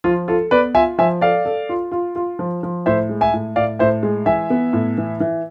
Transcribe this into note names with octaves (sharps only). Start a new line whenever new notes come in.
F3 F4
F4 A4
B3 B4 D5
F4 E5 G#5
F3 E5 G#5
A4 D5 F5
A4
F4
F4
F4
F3
F3
A2 C5 E5
G#3
E5 G#5
A2
A2 D5 F5
A2 C5 E5
G#3
E3 E5 G#5
B3
A2
E3
E3